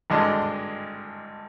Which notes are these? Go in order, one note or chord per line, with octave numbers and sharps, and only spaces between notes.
G#1 G2 D3 G#3 D4